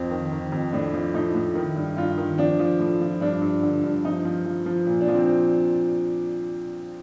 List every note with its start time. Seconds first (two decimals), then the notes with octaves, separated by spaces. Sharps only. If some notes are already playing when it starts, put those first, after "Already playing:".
Already playing: F2 C4
0.11 D#3
0.32 D#3
0.52 F2
0.73 A2 D4
0.94 F3
1.14 A2 D#4
1.35 A2
1.55 D#3
1.76 G2
1.97 G2 F4
2.18 D#3
2.38 F3 D4
2.59 F3
2.79 A2
3.01 F3
3.21 G2 D4
3.42 G2
3.63 D3
3.84 G2
4.05 F3 D#4
4.25 F3
4.46 F3
4.66 F3
4.87 A#2
5.01 D4
5.08 F3
5.14 C4